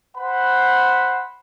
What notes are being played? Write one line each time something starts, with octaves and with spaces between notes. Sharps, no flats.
C5 F#5 B5